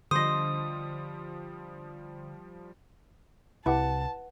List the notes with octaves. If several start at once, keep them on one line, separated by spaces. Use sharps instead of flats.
D3 F3 G3 C5 D#5 C6 D#6
C2 E4 G4 B4 F#5 A5 D6